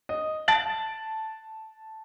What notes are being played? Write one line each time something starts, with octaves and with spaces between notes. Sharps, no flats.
D#5
A5 A6 D7 F#7